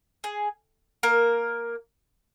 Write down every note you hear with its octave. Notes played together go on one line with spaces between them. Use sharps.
G#4
A#3 A#4